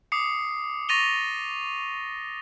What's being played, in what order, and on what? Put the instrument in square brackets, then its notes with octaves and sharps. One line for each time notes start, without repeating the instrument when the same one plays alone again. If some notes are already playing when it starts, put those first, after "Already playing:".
[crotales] D6 D#6 C7 C#7
C#6 A6 A#6 D#7 F7 G7